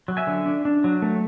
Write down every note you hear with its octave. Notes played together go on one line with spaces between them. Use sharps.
F#3
E5 G#5
D3
D4
D4
F#3
A3